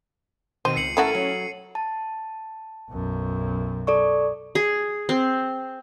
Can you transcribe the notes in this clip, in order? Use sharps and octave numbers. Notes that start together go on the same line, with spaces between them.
B2 D#3 C4 C5 D#7
C#2 C7 C#7 F#7
A3 C#4 E4 F#4 A4 A#4
F#3
A5
B1 F#2
A4 D5 C#6
G#4
C4